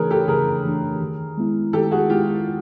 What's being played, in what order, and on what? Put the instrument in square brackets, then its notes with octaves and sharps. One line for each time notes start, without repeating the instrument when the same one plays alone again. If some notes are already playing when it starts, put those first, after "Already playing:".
Already playing: [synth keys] C#3 E3 A3 D4 [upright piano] G#4 A#4 B4 C#5
[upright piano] G4 A4
[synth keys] C#3 [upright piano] G#4 A#4
[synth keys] E3 A3 D4
D#3
G#3 B3 E4
[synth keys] D#3 [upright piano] G4 A4
[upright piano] F#4 G#4
[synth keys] G#3 B3 E4 [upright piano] F4 G4